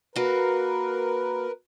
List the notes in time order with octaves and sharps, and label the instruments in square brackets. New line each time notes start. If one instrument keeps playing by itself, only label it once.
[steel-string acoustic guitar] A#3 F#4 [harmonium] A#4 B4